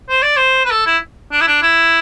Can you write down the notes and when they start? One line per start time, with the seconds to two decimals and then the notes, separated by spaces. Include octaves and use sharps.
0.10 C5
0.23 D5
0.37 C5
0.65 B4
0.71 A4
0.87 E4
1.32 D4
1.42 E4
1.48 D4
1.62 E4